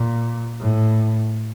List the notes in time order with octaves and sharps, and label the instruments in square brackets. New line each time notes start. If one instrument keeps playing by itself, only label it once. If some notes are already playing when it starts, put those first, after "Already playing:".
Already playing: [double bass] A#2
A2